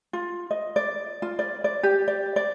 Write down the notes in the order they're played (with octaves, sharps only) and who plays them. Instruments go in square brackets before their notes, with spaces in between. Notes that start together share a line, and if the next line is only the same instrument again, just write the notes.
[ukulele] F4
D#5
D5
F4
D5
D5
G4
D5
D5